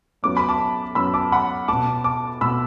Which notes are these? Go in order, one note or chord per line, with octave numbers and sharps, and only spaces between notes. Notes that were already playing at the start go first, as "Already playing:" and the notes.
F#2 F#3 B3 D6
B5
A5 D6
F#2 F#3 B3 B5 E6
A5 D6
F#5 B5
B2 B3 A5 D6
A5 D6
B2 B3 B5 E6